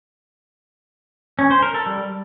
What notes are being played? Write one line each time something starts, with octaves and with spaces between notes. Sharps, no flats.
C#4
C5
A#4
A4
G3